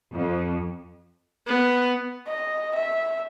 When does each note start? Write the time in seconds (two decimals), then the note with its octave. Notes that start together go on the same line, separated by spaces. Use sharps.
0.13 F2
1.47 B3
2.27 D#5
2.75 E5